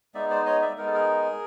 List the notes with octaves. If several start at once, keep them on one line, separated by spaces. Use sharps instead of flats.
G#3 B3 D#4 D5 E5
C5 D5
C#5 D#5
D5 E5
G#3 B3 D#4 A#4
A4
G#4 A#4